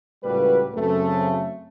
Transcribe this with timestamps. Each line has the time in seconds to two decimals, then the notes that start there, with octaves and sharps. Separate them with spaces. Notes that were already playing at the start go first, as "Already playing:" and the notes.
0.24 C#2 A2 G3 A#3 F#4 B4
0.74 F#2 C#3 A3 C4